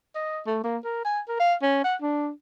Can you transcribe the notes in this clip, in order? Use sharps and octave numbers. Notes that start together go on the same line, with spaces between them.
D#5
A3
A#3
A#4
G#5
A#4
F5
C#4
F#5
D4